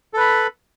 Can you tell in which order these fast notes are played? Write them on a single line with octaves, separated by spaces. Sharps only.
A4 B4 B5